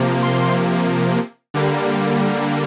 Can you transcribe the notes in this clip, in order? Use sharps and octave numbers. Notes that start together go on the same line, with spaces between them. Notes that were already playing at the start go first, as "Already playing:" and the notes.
Already playing: C3 F3 A#3
C6
D3 G3 A#3